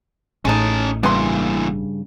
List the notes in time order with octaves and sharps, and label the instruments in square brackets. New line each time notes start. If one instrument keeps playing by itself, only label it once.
[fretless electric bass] A1 A2 [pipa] G#3 D#4 [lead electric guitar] C#4 A5
[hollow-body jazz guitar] G2 C#3 [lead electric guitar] E3 A#3 [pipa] B3 C6